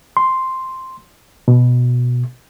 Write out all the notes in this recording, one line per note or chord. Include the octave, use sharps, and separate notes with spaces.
C6
B2